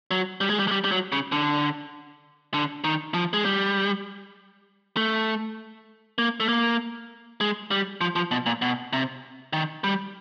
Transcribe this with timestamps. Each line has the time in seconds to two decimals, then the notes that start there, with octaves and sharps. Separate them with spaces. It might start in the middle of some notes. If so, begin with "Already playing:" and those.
0.11 F#3
0.41 G3
0.50 G#3
0.59 G3
0.68 G#3
0.71 G3
0.85 G3
0.91 F#3
1.12 C#3
1.32 D3
2.54 D3
2.84 D#3
3.14 F3
3.33 G#3
3.45 G3
4.97 A3
6.18 A#3
6.40 A3
6.49 A#3
7.41 G#3
7.71 G3
8.01 F3
8.16 F3
8.31 B2
8.46 A#2
8.62 B2
8.93 C3
9.53 D#3
9.84 G3